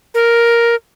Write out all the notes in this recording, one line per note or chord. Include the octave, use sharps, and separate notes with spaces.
A#4